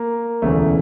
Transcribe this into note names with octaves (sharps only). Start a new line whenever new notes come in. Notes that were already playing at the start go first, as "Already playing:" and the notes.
Already playing: A#3
E1 D2 C#3 E3 A3